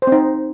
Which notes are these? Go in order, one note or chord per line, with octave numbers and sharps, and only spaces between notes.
C5
C4
D#4